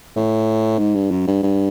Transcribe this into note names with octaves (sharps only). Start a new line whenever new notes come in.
A2
G#2
G2
F#2
G2
G2